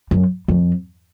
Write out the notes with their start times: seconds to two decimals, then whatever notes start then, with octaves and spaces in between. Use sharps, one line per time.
0.11 F#2
0.48 F2